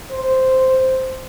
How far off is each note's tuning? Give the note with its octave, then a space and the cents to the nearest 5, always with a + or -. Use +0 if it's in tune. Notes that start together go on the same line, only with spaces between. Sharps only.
C5 -5